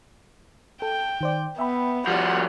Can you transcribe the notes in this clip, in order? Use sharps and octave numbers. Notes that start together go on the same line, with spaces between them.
A4 G5
D#3 C5 D5
B3 E5 G5 B5
F3 G3 F#5